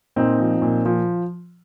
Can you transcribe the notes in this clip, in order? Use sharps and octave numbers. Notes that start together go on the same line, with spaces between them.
A#2 C4 D#4
F3
A#2
F3